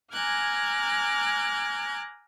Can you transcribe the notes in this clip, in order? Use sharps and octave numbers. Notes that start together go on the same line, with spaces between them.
G#5 A#5 D6 F6 F#6 G#6